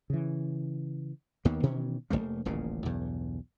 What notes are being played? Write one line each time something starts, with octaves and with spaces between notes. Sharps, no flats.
C#3 E3
D#2 D#3 A#3 B3
B2 D#3 E3 C#4
F1 A2 A3 A#3
D#1 A1 A#2 C#3
B1 E2 G2